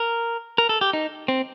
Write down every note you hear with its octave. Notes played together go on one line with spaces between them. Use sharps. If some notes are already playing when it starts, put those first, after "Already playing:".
Already playing: A#4
A#4
A4
G4
D#4
C4